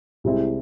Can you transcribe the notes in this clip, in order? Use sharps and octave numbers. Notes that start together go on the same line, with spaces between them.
C2 C3 G#3 C4 E4